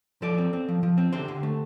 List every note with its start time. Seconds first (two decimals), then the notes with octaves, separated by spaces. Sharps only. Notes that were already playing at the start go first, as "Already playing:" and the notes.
0.22 F3 A4 D5
0.38 C4
0.53 C4
0.68 F3
0.83 F3
0.98 C4
1.13 D3 G4 C5
1.28 D3
1.43 A3